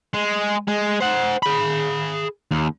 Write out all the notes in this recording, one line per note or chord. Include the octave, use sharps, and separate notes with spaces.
G#3
G#3
C5 F#5
G#4 B5
D#2